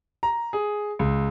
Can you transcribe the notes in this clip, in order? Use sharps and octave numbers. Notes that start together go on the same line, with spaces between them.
A#5
G#4
C#2